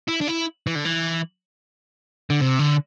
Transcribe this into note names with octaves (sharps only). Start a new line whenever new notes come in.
E4
D4
E4
E3
D3
E3
D3
C3
D3